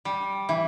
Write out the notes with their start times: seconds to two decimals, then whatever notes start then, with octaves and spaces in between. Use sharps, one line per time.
0.05 G3
0.49 E3